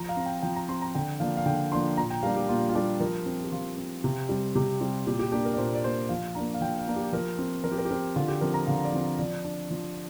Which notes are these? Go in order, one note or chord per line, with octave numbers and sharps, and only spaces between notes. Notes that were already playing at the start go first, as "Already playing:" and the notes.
Already playing: F3 A#5
F5
C4
G5
F3 G5
A#5
C4 C6
A#5
D3 G5
F3 A#3 D4 F5
F5
D3 G5
F3 A#3 D4 C6
A#2 A#5
G5
G3 A#3 D4 F5
G4
A#2 F4
F4
G3 A#3 D4 G4
F3 A#4
C4
G4
F3 F4
C4
C3
G3 C4
C3 G4
G3 C4
A#2 G4
G4
A#3 D4 G4
A#4
D5
A#2 C5
D5
A#3 D4 C5
F3 F5
A#3 D4 A#5
F5
F3 G5
F5
A#3 D4
G4
F3 A#4
C4
F3 A#4
G4
A#4
G4
C4 A#4
D3 F4
G4
F3 C4 A#4
A#5
D3 F5
D5
F3 C4
F5
F3 D5
D4
F3